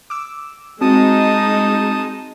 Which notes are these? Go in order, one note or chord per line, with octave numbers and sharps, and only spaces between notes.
D6 E6
G#3 C4 D#4 F#4 A5 D#6